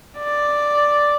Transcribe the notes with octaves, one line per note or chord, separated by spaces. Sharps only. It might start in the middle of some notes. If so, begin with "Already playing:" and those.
D5